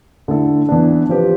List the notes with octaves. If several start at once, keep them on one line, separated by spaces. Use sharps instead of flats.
D3 A3 E4 A4
E3 B3 D4
F3 C4 G4 B4